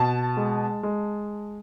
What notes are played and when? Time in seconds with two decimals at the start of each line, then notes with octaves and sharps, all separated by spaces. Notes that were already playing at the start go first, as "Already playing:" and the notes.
Already playing: B2 A5
0.37 G#3
0.83 G#3